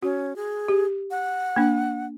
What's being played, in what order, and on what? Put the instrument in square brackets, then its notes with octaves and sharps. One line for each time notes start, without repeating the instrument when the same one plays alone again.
[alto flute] C#4 [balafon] F#4
[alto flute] G#4
[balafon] G4
[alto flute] F#5
[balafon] A#3 D4